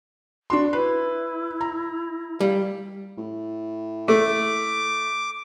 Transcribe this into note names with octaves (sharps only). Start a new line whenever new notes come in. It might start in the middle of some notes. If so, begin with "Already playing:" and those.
D4 F#4 C6
E4 B4
A#5
G3 F5
A2
A3 D6